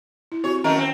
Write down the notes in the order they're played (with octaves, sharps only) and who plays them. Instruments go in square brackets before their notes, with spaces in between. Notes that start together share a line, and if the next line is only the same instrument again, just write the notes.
[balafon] E4
[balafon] C4 F#4 G4 [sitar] C#5
[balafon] D#3 C#4 D#5 [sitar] F#3 A3 A#4
[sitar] C4